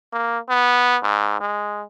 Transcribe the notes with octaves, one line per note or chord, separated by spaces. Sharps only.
A#3
B3
G#2
G#3